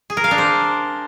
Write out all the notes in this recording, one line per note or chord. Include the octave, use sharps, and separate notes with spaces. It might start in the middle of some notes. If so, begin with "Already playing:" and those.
G#4
A#4
F5
D4
C5